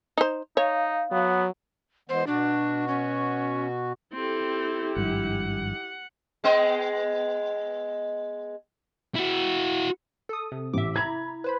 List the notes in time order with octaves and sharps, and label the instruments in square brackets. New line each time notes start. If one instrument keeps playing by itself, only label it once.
[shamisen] D#4 C5
[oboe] D#4 [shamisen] C#5 [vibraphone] F5
[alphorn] F#3 [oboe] B3
[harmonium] E3 G#3 B3 [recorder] C5
[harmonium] B2 F#4 [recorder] D4
[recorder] C#4
[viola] C4 A4 [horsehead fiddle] E4 G4
[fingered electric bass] G#1 G2 F3 [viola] F#5
[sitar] G#3 B3 D#5
[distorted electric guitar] E4 F#4
[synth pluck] A4 D#6
C3
[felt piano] A1 [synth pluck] E5 D6
[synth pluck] E4 A#5 B5 [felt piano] G#6
[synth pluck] B4 C5 B5